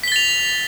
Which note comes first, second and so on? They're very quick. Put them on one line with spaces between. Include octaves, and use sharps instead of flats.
B6 G7 A6 F7